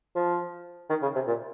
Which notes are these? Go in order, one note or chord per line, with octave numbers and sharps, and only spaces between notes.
F3
D#3
C#3
C3
A#2